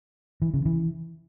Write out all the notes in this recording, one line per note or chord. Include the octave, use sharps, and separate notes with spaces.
E3
C#3
E3